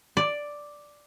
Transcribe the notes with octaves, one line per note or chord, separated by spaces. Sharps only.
D5